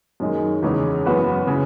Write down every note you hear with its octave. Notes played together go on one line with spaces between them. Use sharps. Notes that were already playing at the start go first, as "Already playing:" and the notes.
F#2 D#3 G#3
E2 C#3 G#3 C#4
F#2 E3 B3 F#4 B4
C#3 E3